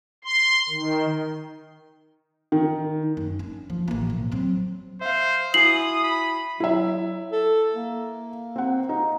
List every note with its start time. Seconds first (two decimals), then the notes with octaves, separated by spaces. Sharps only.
0.24 C6
0.69 D#3
2.52 D#3
3.17 F#2
3.39 C#4 D4
3.70 F3
3.88 A1 A#3
4.10 B1
4.32 F#3 C4
5.01 C5 E5 F5
5.54 E4 F#4 G#5 D#6 C7 F#7
6.04 B5
6.60 F#3 E4 E5
7.32 A4
7.74 A#3
8.56 C4 F#5
8.89 D#4